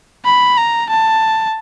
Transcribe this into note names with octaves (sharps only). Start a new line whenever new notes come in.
B5
A#5
A5